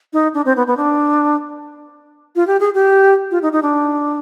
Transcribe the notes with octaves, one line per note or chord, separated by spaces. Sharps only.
D#4
D4
C4
B3
B3
D4
F4
G4
G#4
G4
F4
D#4
D#4
D4